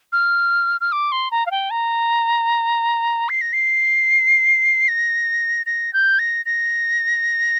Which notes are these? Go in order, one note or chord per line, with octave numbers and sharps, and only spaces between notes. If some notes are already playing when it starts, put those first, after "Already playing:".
F6
F6
D6
C6
A#5
F5
G5
A#5
C7
A#6
C7
A#6
A#6
G6
A#6
A#6